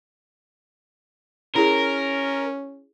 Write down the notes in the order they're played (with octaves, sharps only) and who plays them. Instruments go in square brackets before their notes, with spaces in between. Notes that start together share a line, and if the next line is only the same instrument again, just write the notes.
[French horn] C#4 [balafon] E4 G#4 [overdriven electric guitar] A#4